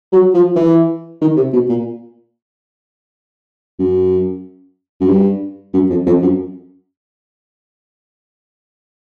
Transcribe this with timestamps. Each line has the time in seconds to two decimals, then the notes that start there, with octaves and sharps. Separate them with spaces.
0.12 F#3
0.34 F3
0.56 E3
1.21 D#3
1.36 C3
1.53 B2
1.69 A#2
3.79 F#2
5.01 F#2
5.09 G2
5.74 F#2
5.90 F2
6.06 F2
6.22 F#2